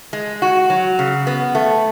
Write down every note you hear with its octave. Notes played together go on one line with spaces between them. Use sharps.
G#3
F#4
F#3
C#3
B3
A3